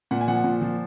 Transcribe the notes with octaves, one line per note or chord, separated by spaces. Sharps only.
A#2 F#5
G#5
F3 F#5
A#2
F3